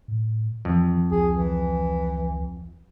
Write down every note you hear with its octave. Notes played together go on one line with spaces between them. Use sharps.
A2
F2 E3
C#2 G#4
E3